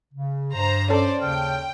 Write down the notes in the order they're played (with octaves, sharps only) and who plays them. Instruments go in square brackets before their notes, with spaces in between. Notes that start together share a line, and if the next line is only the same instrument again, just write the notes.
[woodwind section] C#3
[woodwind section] G2 [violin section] C5 A#5
[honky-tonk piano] C#4 A4 [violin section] C5 D5
[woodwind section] D#2 C#3 F6 [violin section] G5